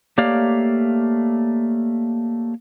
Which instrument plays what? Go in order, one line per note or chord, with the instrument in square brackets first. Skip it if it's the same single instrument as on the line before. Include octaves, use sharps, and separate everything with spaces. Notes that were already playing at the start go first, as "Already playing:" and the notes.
[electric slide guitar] A3 A#3 G4 C#5 D5 F5